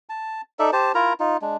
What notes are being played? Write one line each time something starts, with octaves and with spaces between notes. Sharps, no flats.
A5
D#4 A4 D5 E5
G4 C5 A5
E4 F4 A#4 A#5
D#4 F4
G#3 D4